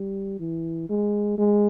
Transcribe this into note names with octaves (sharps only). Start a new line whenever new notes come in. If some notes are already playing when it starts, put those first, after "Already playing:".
Already playing: G3
E3
G#3
G#3